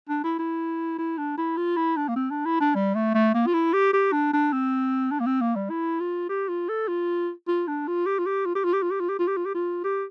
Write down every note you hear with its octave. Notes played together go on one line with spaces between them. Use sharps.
D4
E4
E4
E4
D4
E4
F4
E4
D4
A#3
C4
D4
E4
D4
G3
A3
A3
A#3
F4
E4
G4
G4
D4
D4
C4
D4
A#3
C4
A#3
G3
E4
F4
G4
F4
A4
F4
F4
D4
F4
G4
F4
G4
F4
G4
F4
G4
F4
G4
F4
G4
F4
G4
F4
G4
F4
G4